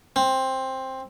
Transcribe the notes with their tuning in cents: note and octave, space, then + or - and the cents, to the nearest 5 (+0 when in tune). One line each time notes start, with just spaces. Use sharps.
C4 +10